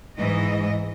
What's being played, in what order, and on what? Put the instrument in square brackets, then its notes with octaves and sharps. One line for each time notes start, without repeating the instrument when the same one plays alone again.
[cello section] G#2 E3 D#5